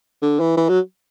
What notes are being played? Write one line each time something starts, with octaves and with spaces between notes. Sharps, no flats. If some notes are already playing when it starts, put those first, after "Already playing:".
D3
E3
E3
F#3